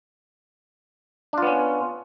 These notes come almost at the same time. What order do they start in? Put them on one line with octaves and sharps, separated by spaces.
D4 F4 B3 C#4